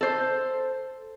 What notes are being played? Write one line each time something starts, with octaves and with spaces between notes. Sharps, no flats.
A4 C5